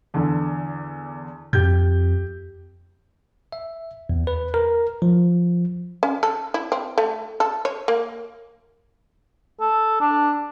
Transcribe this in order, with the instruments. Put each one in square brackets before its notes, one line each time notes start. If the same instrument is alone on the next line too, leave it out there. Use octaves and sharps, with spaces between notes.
[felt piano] E2 D3
[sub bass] F2 [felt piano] G4 G6
[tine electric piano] E5
E2
B4
A#4
F3
[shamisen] C#4
A4
E4
C4
A3
A4
C#5
A#3
[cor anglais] A4
D4